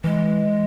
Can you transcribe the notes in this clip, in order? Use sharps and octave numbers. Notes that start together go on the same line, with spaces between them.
E3 G#3